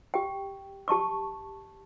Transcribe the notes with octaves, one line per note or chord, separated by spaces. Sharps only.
G4 G5
G4 A5 C#6 D6